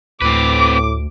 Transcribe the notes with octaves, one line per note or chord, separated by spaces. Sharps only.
D2 A2 C4 B4 D6